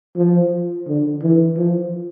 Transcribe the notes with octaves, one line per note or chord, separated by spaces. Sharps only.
F3
D3
E3
F3